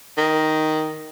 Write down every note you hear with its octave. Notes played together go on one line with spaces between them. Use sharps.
D#3